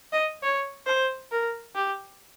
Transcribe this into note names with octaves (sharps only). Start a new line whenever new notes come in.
D#5
C#5
C5
A#4
G4